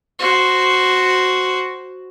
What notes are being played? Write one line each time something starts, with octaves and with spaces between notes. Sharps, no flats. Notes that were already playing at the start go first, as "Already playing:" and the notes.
F#4 C5